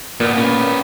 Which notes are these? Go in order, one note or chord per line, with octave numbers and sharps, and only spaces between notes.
A#2 B3 F4
C#4 B4